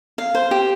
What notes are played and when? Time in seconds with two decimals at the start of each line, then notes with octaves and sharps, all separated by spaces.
0.18 F5
0.35 C5
0.51 G4